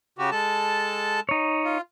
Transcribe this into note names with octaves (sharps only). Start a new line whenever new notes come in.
C#3 F#4 G4
G#3 A4 A5
D#4 C#5
F4